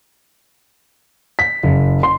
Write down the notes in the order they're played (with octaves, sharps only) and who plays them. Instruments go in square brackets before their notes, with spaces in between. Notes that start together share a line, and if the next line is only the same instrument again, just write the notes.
[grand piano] B6
F#1
C6